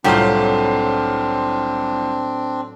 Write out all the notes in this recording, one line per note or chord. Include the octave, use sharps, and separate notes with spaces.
C2 A2 F#3 C4 D4 F4 G4